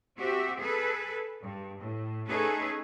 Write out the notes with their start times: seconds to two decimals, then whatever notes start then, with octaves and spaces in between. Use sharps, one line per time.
0.19 C4 F#4 G4 E5
0.59 G#4 A4 B4
1.42 G2
1.79 A2
2.28 A3 C#4 D#4 G#4 A4 B4